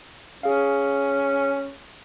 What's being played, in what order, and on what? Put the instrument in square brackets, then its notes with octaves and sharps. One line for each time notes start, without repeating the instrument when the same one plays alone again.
[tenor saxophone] C#4 [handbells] G#4 F5